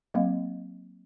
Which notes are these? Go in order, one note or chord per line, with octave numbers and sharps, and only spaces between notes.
F#3 A#3 C4 D#5 F5